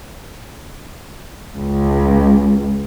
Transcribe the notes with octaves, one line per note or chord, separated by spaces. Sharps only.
C#2